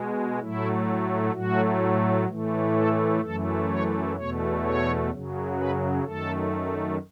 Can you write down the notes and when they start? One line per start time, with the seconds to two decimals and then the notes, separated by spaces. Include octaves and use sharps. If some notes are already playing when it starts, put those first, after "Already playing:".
Already playing: B2 G#3
0.40 A2 F#3 A3 E4
1.33 A2 F#3 A3 F#4
2.28 A2 E3 A3
2.75 A4
3.22 F#2 E3 A3 A4
3.69 C#5
4.16 E2 B2 A3 C#5
4.63 C#5
5.10 F#2 C#3 F#3
5.57 B4
6.04 F#2 D#3 A3 A4